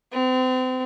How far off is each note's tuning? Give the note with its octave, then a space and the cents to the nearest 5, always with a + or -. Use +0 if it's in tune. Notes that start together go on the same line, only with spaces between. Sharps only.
C4 -35